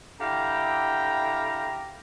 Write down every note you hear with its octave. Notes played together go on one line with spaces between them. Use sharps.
D3 E4 G4 F5 G5 A#5